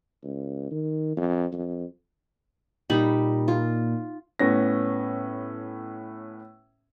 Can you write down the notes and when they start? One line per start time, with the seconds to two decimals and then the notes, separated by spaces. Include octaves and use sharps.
0.23 C#2
0.71 D#3
1.17 F2
1.53 F2
2.90 A#2 G3 D#4 B5
3.48 F4
4.39 A2 B3 C#4 A#6